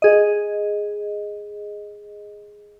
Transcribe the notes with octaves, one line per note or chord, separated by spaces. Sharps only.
G#4 D#5